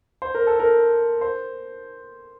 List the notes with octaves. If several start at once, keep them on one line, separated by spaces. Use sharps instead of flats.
C5
A#4
A4
A#4
C5